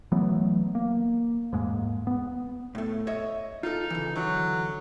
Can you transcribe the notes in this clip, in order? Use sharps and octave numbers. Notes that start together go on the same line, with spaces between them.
E3 F#3 A3 B3
A#3
E2 G#2 G#3 A#3
B3
A2 A3
C#5 D#5 E5
D#4 F4 A4
C#3 E3
D3 E3 F#3